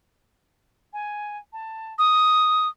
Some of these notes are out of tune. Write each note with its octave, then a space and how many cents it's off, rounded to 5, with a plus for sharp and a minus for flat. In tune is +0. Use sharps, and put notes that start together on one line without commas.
G#5 +5
A5 +15
D#6 +5